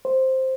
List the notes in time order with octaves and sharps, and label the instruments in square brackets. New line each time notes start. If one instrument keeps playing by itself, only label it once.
[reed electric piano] C5